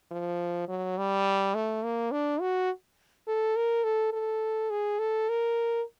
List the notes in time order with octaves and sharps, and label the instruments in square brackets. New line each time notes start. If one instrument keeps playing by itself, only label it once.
[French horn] F3
F#3
G3
A3
A#3
D4
F#4
A4
A#4
A4
A4
G#4
A4
A#4